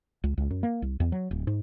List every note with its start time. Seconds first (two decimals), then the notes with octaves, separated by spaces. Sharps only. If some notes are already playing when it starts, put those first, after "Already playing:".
0.24 C#2
0.38 C#2
0.50 F#2
0.63 A#3
0.82 C2
1.00 E2
1.12 F#3
1.31 D1
1.47 G#2